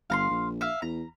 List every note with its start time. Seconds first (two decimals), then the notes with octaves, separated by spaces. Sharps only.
0.10 G1 F5 A#5 C6
0.30 A#1
0.61 E5 F5
0.82 E2 A#5